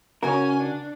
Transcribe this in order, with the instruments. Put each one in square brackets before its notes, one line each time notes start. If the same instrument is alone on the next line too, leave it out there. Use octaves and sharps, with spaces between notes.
[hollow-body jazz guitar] C#3 F#4 A#4 [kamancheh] C#4 G#5
[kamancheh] D4